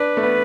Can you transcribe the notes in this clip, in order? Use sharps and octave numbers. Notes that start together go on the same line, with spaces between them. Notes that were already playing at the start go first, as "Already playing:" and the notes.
Already playing: D4 B4
A3
B3